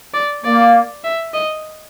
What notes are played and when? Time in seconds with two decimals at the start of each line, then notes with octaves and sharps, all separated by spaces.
0.14 D5
0.44 A#3 D5
1.04 E5
1.34 D#5